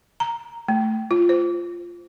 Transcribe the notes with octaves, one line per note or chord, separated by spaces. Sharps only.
A#5
A3
F4
C5